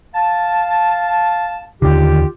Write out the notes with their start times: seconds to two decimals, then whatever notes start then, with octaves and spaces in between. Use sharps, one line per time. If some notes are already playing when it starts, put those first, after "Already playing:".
0.15 F5 A5
1.82 D#2 D3 D#3 F4 G4